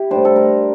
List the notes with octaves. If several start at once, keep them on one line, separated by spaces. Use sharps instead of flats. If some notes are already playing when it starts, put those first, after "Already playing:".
Already playing: E4 G4
A2 G3 D4 C5
A4
A#4